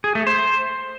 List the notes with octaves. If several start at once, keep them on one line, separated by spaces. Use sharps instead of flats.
G#4
A3
C5